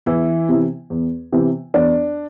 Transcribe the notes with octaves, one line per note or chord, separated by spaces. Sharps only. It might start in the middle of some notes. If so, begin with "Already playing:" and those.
E2 E3 E4
C3 E3
E2
C3 E3
E2 D4